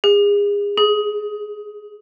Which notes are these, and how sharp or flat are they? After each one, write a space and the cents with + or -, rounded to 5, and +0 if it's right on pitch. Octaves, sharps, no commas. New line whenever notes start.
G#4 -30
G#4 +15